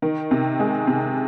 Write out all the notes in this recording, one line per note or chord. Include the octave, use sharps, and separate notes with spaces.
D#3
C3
G#3
C3